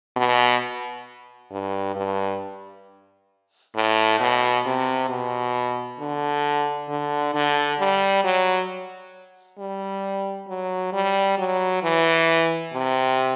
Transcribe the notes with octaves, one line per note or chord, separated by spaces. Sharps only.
B2
G2
G2
A2
B2
C3
B2
D3
D3
D3
G3
F#3
G3
F#3
G3
F#3
E3
C3